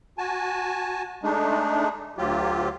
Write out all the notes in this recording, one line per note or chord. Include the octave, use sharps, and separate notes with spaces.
F#4 G#5 A5
G#3 A3 D4 D#4
D2 F#3 F4 G4